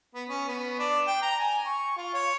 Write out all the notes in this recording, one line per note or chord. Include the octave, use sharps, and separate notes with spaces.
B3
C#4
B3
D4
G5
A#5
G#5
C#6
F4
C#5